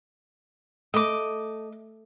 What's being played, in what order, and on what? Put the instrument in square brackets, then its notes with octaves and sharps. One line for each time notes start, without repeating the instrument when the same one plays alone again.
[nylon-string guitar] A3 [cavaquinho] D#5 D6